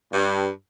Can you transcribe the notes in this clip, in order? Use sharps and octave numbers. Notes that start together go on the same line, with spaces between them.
G2